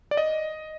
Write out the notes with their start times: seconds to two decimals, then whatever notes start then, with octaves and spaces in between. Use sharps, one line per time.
0.11 D5
0.17 D#5